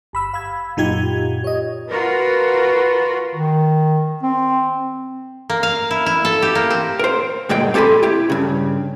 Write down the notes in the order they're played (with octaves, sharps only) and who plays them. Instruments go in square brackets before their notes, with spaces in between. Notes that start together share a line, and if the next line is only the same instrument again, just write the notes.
[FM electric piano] G1 B5 E6
F5 B5 E6 G#6
F#2 A#2 D#4 F4 G4 G#6
C#5 D#5
[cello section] F4 F#4 A#4 [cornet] B4
[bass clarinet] D#3
C4
[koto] A#3
F5
E4
E4
A4
G4
A#3
C4
[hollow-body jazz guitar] A#4 C5
D2 G2 A#2 G#3 G5
C4 G4 A4 G#5 B5 C6
E4 G4
G2 C#3